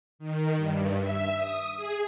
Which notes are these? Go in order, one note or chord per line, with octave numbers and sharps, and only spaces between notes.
D#3
G2
E5
D#6
G#4